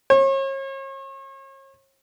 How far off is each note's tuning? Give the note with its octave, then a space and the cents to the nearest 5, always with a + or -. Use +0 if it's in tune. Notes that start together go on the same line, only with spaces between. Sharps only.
C#5 -40